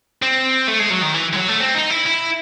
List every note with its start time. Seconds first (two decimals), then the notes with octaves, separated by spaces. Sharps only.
0.22 C4
0.68 A3
0.80 G#3
0.91 F#3
1.02 D#3
1.14 E3
1.33 G#3
1.37 F#3
1.49 A3
1.60 C4
1.75 D#4
1.91 E4
2.06 E4